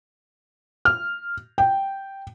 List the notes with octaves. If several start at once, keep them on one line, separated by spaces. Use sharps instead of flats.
F6
G5